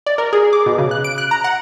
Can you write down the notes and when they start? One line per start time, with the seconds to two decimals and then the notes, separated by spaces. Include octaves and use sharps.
0.06 D5
0.18 A#4
0.33 G#4
0.53 D6
0.66 B2
0.78 C#3
0.91 F#6
1.04 D7
1.18 F#6
1.31 A#5
1.44 F#5